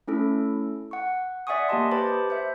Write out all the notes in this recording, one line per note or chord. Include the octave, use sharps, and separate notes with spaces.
A3 C#4 E4 A4
F#5 C#6
D5 E5 F#5 G#5 C#6 D#6
A#3 G4 D#5 A5 C6
G4 B4 C5 A5 B5 D6
C5 E5